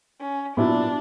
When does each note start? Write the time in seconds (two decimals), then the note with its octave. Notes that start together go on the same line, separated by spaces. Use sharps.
0.21 C#4
0.56 A#2 F#3 B3 D4 E4